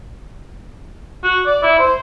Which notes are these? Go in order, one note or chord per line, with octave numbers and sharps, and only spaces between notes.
F#4
D5
E4
C5